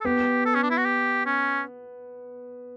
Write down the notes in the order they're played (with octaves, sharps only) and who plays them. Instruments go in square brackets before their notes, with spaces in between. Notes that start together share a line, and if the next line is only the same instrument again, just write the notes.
[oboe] A4
[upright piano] B3 [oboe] G4
[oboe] A4
C#4
D4
E4
F#4
G4
C#4